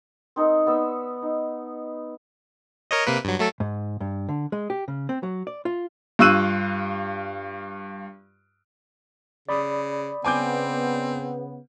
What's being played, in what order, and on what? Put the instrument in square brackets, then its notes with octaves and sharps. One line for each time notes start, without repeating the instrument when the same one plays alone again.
[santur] C4 D#4 A4 A#4
B3 D5 E6
D#4
[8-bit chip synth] A#4 C#5 D#5
C3 A#3 B4
G2 F#3
F#3 A3 A4
[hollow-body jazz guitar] G#2
G2
D3
G#3
G4
C#3
C4
F#3
D5
F4
[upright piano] G2 F4 C#6 E6 F#6 D#7
[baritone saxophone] C#3 [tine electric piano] D5 B5 D#6
[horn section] C#3 B3 [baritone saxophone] C4 [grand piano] G#5 D6 G6